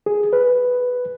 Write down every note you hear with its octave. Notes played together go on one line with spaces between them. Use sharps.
G#4
B4